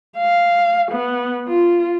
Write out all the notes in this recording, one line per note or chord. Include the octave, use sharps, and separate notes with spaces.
F5
B3
F4